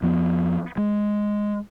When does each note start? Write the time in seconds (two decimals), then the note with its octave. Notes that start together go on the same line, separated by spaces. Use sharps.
0.02 F2 F3 B3
0.78 G#3